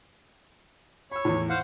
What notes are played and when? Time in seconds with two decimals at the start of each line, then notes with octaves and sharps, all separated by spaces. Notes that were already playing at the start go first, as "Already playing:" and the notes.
1.12 C#5 B5 E6
1.25 E2 A2
1.49 C5 F5 F#5